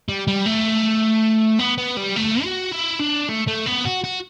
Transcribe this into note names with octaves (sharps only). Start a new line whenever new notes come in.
G3
G3
A3
B3
B3
G3
A3
F#4
E4
D4
A3
A3
B3
F#4
F#4